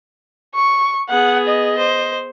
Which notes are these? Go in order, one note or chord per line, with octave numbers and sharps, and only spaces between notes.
C#6
B3 G#4 F#5
D#5
C5